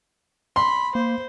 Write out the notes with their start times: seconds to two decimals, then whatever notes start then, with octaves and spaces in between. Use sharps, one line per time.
0.56 B5 C6
0.95 A#3 C5